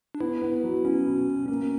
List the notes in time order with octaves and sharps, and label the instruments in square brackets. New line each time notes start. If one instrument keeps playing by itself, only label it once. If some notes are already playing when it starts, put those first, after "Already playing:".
[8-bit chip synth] D4
[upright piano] B3 [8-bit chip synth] E4
[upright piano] B3
F#3
[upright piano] B3 [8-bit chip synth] C#4
[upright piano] B2
B2
[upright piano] A#3 [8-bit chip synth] C#4